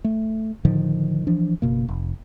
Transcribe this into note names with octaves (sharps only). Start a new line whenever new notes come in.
A3
A2 D3 D#3 F3
E3 F3 D4
F#1 B2 A#3
F1